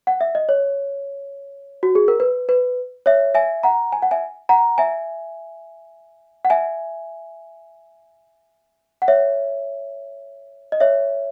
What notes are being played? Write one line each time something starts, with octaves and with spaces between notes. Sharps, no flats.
F#5
E5
D#5
C#5
F#4
G#4
A#4
B4
B4
C#5 E5
E5 G#5
F#5 A#5
G#5
F#5
E5 G#5
F#5 A#5
E5 G#5
F#5
E5 G#5
F#5
C#5 E5
D#5
C#5 E5